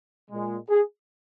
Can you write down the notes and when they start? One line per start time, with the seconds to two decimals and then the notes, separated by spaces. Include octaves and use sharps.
0.31 A#2 G#3
0.69 G#4